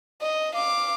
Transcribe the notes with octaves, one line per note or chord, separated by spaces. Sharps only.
D#5
F5 D6